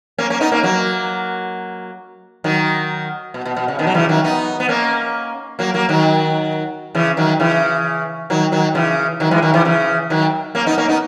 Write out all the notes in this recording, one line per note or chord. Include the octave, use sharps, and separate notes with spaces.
A#3 C#4
A#3 C#4
B3 D#4
A#3 C#4
F#3 A#3
D#3 F#3
B2
B2
B2
C#3
B2 D#3
F#3
C#3 E3
D#3 F#3
B3 D#4
B3
A#3 C#4
F#3 A#3
F#3 A#3
D#3 F#3
C#3 E3
D#3 F#3
C#3 E3
D#3 F#3
D#3 F#3
C#3 E3
D#3 F#3
E3 G#3
D#3 F#3
C#3 E3
C#3 E3
D#3 F#3
A#3 C#4
B3 D#4
A#3 C#4
B3 D#4